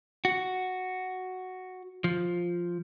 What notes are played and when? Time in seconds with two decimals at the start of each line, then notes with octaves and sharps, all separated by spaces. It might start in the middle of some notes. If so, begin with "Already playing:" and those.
0.25 F#4
2.04 F3